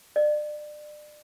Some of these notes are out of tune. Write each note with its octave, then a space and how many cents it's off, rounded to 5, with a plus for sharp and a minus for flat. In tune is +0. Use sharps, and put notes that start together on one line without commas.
D5 +35